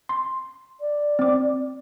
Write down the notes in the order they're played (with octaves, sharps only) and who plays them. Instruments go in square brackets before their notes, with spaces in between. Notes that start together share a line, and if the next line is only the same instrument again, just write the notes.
[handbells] C6
[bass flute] D5
[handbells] C4 D6